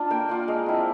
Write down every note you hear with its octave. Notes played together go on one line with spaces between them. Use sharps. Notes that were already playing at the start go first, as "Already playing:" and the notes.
Already playing: D4 F4
A#3 G5
D4 F4 F#5
G#3 F5
C4 E4